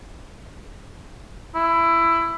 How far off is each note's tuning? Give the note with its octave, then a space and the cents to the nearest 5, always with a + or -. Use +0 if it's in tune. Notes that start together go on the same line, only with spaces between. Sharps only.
E4 +15